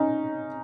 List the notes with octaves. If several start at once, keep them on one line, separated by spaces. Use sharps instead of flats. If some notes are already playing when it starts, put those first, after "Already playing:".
Already playing: C#4 D#4